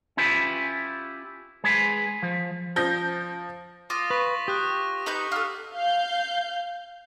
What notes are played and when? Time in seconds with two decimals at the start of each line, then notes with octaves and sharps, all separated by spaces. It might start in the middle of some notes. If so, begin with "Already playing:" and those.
0.17 C#4 E4 F4 G4 B4
1.64 G#3 G#4 B4
2.23 F3
2.76 F3 G6 A#6
3.90 F4 D6 D#6 A#6
4.10 B4 C#6 B6
4.48 G4 D#6 F#6
5.06 D#4 B4 G6 F#7
5.32 F4 A4
5.73 F5 G6